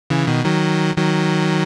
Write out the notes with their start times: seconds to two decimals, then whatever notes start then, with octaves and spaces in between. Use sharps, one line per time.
0.10 C#3 E3
0.27 B2 D#3
0.45 D#3 F#3
0.97 D#3 F#3